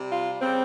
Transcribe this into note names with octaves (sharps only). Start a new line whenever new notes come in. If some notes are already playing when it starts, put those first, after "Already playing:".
Already playing: C3 G3
F4
C#3 G3 C4